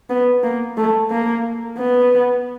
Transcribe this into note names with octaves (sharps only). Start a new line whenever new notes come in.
B3
A#3
A3
A#3
B3